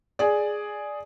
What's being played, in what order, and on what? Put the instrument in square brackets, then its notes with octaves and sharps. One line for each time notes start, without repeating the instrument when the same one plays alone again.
[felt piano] G#4 D5